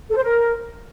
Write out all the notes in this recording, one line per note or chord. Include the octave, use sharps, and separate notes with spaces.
A4
C5
A#4